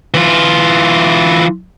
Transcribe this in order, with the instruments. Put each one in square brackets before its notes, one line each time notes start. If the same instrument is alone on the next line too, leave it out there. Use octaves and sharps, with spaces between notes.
[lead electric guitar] E3 F4